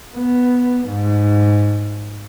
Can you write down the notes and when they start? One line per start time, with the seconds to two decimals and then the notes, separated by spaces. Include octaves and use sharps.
0.16 B3
0.87 G#2